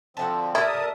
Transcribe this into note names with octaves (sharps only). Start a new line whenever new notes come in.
D3 F3 C4 F#4 E5 A5
D3 D4 E4 G4 A#4 E5 A5 D#6